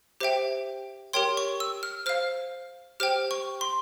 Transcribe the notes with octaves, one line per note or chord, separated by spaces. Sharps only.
G4 C5 E5 G5
G4 A#4 C#5 G5 C6
C#6
E6
F6
C5 F5 F6
G4 C5 G5 F6
C#6
C6